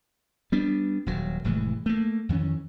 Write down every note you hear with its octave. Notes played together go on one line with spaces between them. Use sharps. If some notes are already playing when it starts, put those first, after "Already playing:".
G3 B3 D4
D#1 F#3
F1 A2 E3 G#3
A3 A#3
F2 D#3 E3 C#4